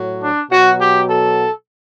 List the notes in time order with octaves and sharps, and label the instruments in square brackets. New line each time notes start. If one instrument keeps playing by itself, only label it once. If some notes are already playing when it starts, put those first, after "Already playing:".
Already playing: [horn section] A2 F#3
D4
B2 F#3 F#4
G4
A4